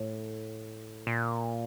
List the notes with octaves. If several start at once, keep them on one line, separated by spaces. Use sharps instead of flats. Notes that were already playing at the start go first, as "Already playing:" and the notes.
Already playing: A2
A#2